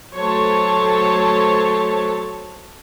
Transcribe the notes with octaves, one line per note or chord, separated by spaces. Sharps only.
F#3 A3 C5 C#5 A5